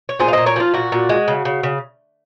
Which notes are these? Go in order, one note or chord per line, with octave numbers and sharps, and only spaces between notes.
C#5
A#2 G#4 C5
F5
A#2 C5 D#5
A#4 C#5
F3 F4
A#2 F#4
A#2
G#3
C#3
C#3
C#3